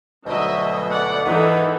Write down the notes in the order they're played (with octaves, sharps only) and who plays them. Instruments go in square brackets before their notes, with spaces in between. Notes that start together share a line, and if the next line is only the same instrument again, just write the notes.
[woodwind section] D2 B2 [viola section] F#3 D#5 E5
[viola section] D5 F#5
[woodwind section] G#2 D#3 B3 [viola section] E3 D#4 A4